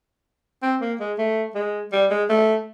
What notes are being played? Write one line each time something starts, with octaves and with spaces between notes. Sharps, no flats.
C4
A#3
G#3
A3
G#3
G3
G#3
A3